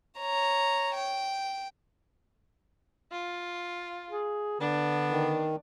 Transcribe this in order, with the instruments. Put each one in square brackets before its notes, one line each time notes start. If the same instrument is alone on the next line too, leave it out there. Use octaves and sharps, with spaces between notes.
[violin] C#5 A#5
G5
[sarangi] F4
[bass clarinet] G#4
[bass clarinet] D3 [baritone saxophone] B3 [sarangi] D4
[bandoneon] D#3